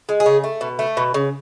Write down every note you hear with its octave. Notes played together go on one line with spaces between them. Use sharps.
G#3
G#4
C#3
A3
B2
A3
B2
C#3